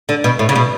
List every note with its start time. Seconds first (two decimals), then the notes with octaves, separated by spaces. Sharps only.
0.09 D3
0.24 B2
0.39 A2
0.49 C#3
0.56 B2